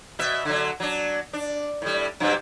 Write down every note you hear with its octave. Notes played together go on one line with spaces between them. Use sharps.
B2 E5
D3 F#3
F#3 D4
D4
A2 G3
G2 C3 F#3